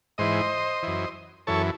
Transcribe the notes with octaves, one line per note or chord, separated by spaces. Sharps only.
G#2 E3 C5 D#5
F#2 E3
F#2 E3 A4 C#5